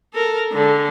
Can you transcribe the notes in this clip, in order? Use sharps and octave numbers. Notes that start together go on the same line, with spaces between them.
A4 A#4
D3 G#3